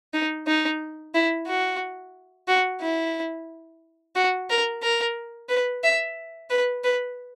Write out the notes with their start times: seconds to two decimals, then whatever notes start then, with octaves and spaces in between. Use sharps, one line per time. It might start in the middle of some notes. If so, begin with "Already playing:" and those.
0.14 D#4
0.47 D#4
1.15 E4
1.47 F#4
2.48 F#4
2.82 E4
4.16 F#4
4.50 A#4
4.82 A#4
5.49 B4
5.84 E5
6.50 B4
6.84 B4